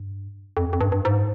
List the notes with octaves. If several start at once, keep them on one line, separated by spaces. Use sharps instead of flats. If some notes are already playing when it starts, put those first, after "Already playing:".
Already playing: G2
F2
F2
G2
G2
G#2